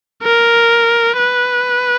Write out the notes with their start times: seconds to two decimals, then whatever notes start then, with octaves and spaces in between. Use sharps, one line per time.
0.23 A#4
1.18 B4